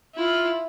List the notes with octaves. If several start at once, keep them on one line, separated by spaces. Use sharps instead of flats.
E4 F4